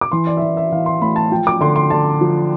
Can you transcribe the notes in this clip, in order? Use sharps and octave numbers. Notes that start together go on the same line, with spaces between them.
D6
E3 C6
D5
E5
E3 D5
E5
E3 F5
C6
A2 B5
A5
F3 G5
D6
D3 C6
C6
D3 A5
F3